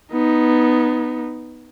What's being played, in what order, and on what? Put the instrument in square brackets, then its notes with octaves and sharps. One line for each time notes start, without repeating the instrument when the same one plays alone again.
[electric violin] B3 D#4